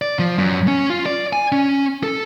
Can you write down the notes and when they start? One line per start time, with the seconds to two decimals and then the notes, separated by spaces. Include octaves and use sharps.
0.02 D5
0.19 F3
0.38 F#2
0.68 C#4
0.90 F4
1.06 D5
1.33 G#5
1.52 C#4
2.03 A4